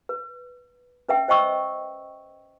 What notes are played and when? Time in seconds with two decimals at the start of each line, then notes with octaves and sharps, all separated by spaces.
0.09 B4
1.08 C#4 B4 E5 G5
1.28 C5 D#5 G5 C#6 E6